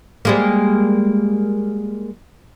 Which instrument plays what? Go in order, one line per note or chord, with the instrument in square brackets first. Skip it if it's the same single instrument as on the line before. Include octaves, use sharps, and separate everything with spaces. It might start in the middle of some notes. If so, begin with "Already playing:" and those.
[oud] G3 G#3 A#3